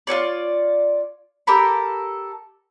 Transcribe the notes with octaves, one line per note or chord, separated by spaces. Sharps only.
F4 F#4 C#5 D5
G4 A4 A#4 B5